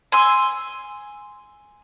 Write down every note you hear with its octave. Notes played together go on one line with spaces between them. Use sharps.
G#5 C6 E6